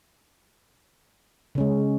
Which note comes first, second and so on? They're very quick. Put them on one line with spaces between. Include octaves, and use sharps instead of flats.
C#3 C#4 G#3